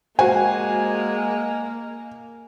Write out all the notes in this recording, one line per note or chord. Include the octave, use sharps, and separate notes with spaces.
G#3 A#3 F#4 C5 G#5